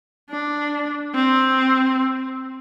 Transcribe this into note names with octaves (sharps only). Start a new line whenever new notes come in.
D4
C4